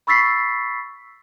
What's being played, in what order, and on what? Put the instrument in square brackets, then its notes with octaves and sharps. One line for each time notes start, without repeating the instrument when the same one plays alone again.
[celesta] B5 C#6 E6 A6 B6 C7